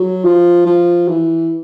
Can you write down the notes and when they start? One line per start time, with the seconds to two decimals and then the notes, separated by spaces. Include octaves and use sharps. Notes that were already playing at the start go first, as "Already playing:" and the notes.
Already playing: F#3
0.24 F3
0.66 F3
1.08 E3